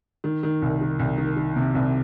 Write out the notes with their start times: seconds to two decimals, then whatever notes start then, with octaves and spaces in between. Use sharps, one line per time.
0.24 D#3
0.43 D#3
0.62 C2
0.81 D#3
0.99 C2
1.18 D#3
1.37 D#3
1.56 C3
1.75 C2